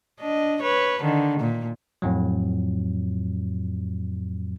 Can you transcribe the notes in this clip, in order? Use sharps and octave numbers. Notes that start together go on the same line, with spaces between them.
D4 D#5
B4 C#5
D3 D#3
A#2
F2 A2 F#3